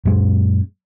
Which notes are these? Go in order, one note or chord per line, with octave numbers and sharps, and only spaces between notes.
F#2 A#2 G#3